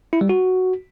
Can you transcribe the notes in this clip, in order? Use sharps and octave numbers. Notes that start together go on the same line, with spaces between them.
E4
G3
F#4